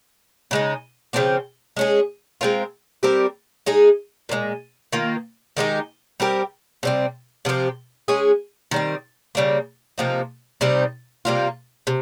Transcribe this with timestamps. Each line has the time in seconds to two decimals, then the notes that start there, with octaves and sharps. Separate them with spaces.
0.51 C#3 G#3 D#4
1.13 C#3 F3 C4 G4
1.77 G#3 C#4 G#4
2.41 G#3 C4 F4 A#4
3.03 G3 C4 G4 A#4
3.66 G#3 D#4 G#4
4.29 A#2 F3 G#3
4.93 D#3 A#3 F4
5.57 D#3 G#3 D#4 G4
6.20 G3 C4 G4 A#4
6.83 C3 G3 C4
7.45 C3 F3 C4 G4
8.08 G#3 C#4 G#4
8.71 D#3 G3 C4
9.35 C#3 G3 A#3
9.98 C3 F3 A#3 D#4
10.61 C3 G3 C4 D#4
11.25 C3 G3 A#3 F4
11.87 C3